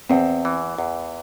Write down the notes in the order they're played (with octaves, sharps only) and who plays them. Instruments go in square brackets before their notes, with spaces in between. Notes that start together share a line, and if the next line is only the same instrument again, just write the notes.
[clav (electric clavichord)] E2 [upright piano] C4
[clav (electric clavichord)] E3
E2